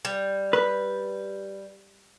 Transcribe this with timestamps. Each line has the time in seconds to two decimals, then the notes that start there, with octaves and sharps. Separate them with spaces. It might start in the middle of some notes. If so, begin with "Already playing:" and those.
0.05 G3
0.53 B4